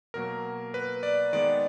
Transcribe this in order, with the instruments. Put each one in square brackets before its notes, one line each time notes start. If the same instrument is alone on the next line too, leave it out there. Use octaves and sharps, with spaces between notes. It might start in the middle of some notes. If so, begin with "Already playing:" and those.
[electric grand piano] B2 F#3 A#3 A#4
B4
D5
D#3 G#3 B3 D5